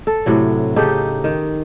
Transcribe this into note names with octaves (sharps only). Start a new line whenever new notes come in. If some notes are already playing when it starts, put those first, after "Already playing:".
A4
A2 C3 F#3
C#3 D#4 G4 A4
D#3